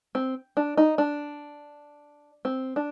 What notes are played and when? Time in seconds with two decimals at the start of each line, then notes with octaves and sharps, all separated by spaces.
0.15 C4
0.57 D4
0.77 D#4
0.98 D4
2.45 C4
2.76 D4